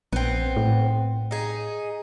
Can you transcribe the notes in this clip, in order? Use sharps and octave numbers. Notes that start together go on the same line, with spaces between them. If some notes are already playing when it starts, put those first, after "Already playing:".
A#1 B3 C4
A2
D#4 G#4